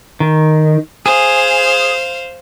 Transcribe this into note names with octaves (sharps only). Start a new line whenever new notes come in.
D#3
G#4 C5 F5